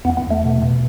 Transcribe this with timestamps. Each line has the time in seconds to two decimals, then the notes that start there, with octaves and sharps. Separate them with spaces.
0.05 E2 B3
0.17 B3
0.24 E2
0.31 A3
0.44 B2
0.62 B2